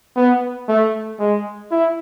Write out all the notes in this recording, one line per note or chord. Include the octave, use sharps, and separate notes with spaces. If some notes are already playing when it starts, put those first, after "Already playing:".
B3
A3
G#3
E4